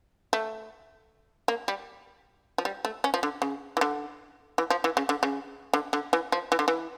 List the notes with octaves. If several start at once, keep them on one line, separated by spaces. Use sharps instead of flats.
A3
A#3
G3
F3
G3
A3
C#4
F3
D3
C#3
E3
D3
E3
F3
E3
C#3
D3
C#3
D3
D3
E3
F3
E3
D3
E3